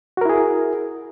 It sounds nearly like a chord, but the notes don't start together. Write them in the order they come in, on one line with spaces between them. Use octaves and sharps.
F#4 A#4 E4 G#4